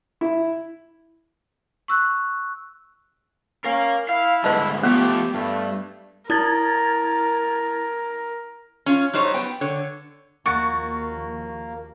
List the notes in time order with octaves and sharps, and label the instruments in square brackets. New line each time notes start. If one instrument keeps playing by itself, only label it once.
[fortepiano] E4
[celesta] C#6 E6 F#6
[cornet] C#4 [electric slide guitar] A#4 F5
[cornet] E4 [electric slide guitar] F5
[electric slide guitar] G#2 D3 G3 [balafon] B4 D#5 A5
[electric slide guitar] F3 A3 A4 [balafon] B3 [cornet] G4
[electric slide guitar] G2 [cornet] A3
[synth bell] E4 G#6 A6 [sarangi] A#4
[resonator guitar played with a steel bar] C#4 F4
F#3 G3 D#4 C5 C#5
B3 G5
D3 C#5
[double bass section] D#2 F3 [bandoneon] A#3 [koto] F#4 [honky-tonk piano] C#6 A6 C#7